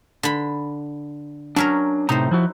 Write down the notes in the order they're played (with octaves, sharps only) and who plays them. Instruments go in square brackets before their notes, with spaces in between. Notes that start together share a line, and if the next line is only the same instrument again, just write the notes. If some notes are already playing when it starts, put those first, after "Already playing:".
[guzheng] D3 B5
[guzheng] F#3 C#4 A#4 [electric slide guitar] D4
[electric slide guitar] A2 C3 A#5 [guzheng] D#4 C5
[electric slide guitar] F3 E4 F#4